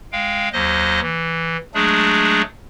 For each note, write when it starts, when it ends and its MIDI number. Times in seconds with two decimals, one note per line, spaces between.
0.12 0.49 56
0.12 0.49 77
0.12 0.49 79
0.53 1.01 39
0.53 1.01 54
0.53 1.01 72
0.53 1.01 75
1.02 1.57 52
1.74 2.42 54
1.74 2.42 56
1.74 2.42 57
1.74 2.42 62
1.74 2.42 68